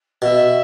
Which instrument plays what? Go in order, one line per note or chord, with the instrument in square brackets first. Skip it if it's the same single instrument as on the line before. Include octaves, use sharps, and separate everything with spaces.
[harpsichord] B2 [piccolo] E5